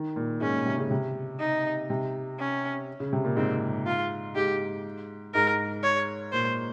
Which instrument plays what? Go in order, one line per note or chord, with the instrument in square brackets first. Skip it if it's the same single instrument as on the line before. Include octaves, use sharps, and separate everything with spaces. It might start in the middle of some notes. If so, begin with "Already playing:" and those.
Already playing: [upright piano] D#3
A#2
[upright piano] G#2 [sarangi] C#4
[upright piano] A#2
C3
C#3
C3
[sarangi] D#4
[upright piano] C3
[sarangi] C#4
[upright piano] C#3
C3
A#2
[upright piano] G#2 [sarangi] C4
[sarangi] F4
[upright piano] G#2 [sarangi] G4
[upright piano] G#2 [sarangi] A#4
[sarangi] C#5
[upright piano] A#2 [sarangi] C5